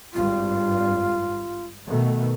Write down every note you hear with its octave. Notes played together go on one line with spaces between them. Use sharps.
G#1 G2 F4
B2 D#3 A3